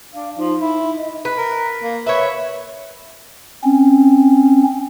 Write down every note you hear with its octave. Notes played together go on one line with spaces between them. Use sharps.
D4 F5
F3 D#4
E4
D#5
B4
A#4
A#3
B4 C#5 E5
C4 C#4